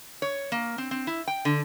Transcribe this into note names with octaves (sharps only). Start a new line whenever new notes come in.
C#5
A#3
C4
C4
E4
G5
D3